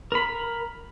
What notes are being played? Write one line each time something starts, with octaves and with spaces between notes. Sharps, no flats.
A#4 B5